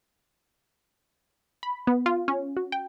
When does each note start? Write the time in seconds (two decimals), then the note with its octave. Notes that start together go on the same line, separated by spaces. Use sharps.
1.63 B5
1.87 B3
2.06 F4
2.28 C#4
2.57 F#4
2.72 G5